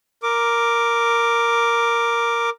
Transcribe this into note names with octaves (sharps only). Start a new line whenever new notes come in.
A#4 D6